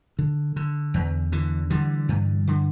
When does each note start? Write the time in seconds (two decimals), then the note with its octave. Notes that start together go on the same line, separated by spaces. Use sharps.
0.18 D3
0.56 D3
0.94 E2
1.32 D3 E3
1.70 D3 E3 G3
2.09 G2
2.47 D3